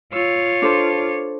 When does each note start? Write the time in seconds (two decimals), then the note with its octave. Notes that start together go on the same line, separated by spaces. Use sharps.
0.13 F4 C#5 E6
0.62 D4 A4 C5